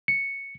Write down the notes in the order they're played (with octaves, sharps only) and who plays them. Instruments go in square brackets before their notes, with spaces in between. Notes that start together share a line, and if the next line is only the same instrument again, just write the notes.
[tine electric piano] C#7